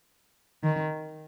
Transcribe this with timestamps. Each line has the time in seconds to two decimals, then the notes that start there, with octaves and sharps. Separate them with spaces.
0.63 D#3